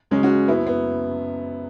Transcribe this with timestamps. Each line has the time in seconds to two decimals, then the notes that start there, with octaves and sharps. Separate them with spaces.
0.11 C#2 C#3 F#3 G#3 C#4
0.23 C#4 F#4
0.48 F#1 F#2 F#3 B3 E4
0.67 B3